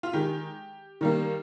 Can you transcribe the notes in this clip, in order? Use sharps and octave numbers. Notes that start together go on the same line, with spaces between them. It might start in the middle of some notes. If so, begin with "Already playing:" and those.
F4
D#3 G#3 G4
D#3 G3 A#3